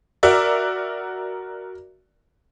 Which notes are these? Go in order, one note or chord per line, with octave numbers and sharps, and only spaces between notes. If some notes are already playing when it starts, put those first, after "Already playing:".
F#4 A#4 D5 E5